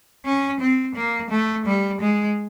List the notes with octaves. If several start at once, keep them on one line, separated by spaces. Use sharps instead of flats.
C#4
C4
A#3
A3
G3
G#3